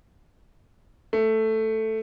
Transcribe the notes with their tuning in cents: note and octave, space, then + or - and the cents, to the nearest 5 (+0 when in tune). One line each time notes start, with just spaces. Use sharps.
A3 +5